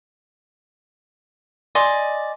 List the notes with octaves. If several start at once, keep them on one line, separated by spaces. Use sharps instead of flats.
D5 D#5 G#5 C6